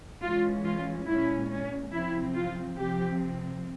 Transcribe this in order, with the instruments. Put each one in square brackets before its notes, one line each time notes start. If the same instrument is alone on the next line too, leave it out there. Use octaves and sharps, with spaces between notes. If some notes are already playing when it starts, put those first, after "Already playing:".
[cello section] E3 G#3 C#4 F4
F4
A#2 G#3 C#4 E4
C#4
C3 F3 C4 E4
F4
C3 F3 C4 G4